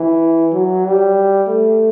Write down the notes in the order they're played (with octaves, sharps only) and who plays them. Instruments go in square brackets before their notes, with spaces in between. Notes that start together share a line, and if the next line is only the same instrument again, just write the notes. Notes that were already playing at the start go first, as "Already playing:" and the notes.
Already playing: [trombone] E3
F#3
G3
A3